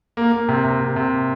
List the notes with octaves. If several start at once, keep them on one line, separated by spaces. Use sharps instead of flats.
A#3
A#3
C3
C3
C3
C3